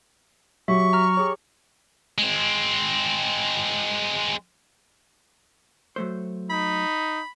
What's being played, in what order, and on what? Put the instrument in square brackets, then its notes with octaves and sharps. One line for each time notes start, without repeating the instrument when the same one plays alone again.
[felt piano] F#3 [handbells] F#4 G4 E5 [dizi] C#6
[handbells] A#5 F6
G4 G#4 C#5
[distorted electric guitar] G#3 C4
[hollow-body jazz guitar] F#3 A3 C5
[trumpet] D#4 [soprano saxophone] B5